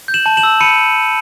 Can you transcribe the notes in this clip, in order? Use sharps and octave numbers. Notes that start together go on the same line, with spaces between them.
G6
E7 F#7
A5
E7 F#7
E6
B5 C#7 D#7